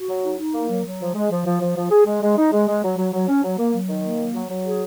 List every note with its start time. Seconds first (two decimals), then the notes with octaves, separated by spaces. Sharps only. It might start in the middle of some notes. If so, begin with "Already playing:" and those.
Already playing: F#4
0.09 F#3
0.24 D#4
0.39 D#4
0.54 A#3
0.70 F#3
0.85 F#3
1.01 F3
1.15 G#3
1.30 F3
1.46 F3
1.61 F3
1.77 F3
1.91 G#4
2.06 G#3
2.22 G#3
2.37 D#4
2.52 G#3
2.67 G#3
2.83 F#3
2.98 F#3
3.14 F#3
3.28 C#4
3.43 F#3
3.58 A#3
3.74 F#3
3.89 D#3
4.04 A#3
4.19 F#3
4.35 F#3
4.50 F#3
4.65 G#4